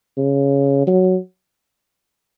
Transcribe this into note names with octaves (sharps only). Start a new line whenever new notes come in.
C#3
F#3